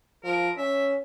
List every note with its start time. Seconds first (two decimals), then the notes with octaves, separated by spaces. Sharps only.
0.24 F3 A#4
0.58 C#4 E5